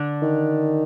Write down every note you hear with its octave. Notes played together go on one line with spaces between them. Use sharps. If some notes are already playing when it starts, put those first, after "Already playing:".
Already playing: D3 D4
D#3